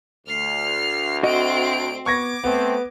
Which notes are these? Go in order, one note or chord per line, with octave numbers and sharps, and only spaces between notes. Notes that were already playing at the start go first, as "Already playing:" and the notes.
D2 F6 C7
C4 F#4 D#5 D7
B3 C#6 D6 G#6 A#6
A3 B3 C4